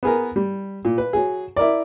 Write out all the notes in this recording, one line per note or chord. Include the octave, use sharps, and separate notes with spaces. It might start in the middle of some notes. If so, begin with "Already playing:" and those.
B3 G#4 A#4
G3
A#2
B4
F#3 G#4
E4 A#4 D5